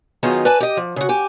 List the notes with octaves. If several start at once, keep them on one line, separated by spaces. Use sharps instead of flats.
D#3 F#3 B3 D#4 F4 G#4
B4 D5 G#5 A5
G4 D#5
F3
C#3 F#4
G4 G#5